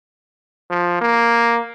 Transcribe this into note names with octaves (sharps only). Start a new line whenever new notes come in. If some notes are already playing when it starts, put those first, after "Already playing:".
F3
A#3